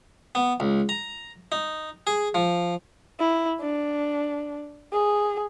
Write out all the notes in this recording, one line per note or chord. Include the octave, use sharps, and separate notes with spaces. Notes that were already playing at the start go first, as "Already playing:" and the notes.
B3
C#2
A#5
D#4
G#4
F3
E4
D4
G#4